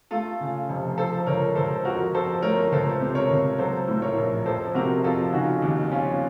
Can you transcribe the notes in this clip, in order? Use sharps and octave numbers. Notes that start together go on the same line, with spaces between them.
A3 F4 A4
C#3
F1
F3 A4 C5
C#2 A#4 C#5
C#2 A4 C5
F2 F#4 A#4
F2 A4 C5
A3 A#4 C#5
C#2 A4 C5
C3
A#4 C#5
C#2
F#3 A4 C5
A2
A#4 C#5
A#1
F2 A4 C5
C3 F#4 A#4
F2 F4 A4
C#3 D#4 F#4
D#2
F3 C#4 F4